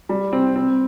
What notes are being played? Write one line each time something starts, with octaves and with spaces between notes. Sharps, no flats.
G3
C4
C4